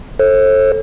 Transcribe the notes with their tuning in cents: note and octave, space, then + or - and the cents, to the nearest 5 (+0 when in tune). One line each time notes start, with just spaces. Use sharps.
A4 +0 C5 +45